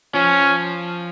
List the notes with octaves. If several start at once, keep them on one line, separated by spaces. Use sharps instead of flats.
F3 C#4